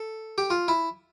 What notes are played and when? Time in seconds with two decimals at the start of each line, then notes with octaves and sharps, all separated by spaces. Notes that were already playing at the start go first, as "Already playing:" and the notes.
Already playing: A4
0.38 G4
0.50 F4
0.68 E4